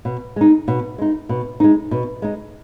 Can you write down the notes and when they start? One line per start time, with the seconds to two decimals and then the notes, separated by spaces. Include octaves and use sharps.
0.05 B2
0.36 G#3 D#4
0.68 B2
0.98 G#3 D#4
1.29 B2
1.60 G#3 D#4
1.91 B2
2.22 G#3 D#4